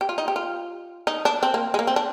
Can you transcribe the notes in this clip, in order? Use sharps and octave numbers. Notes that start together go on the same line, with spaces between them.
G4
F4
D#4
G4
F4
D#4
D4
C4
A#3
G#3
A#3
C4
D4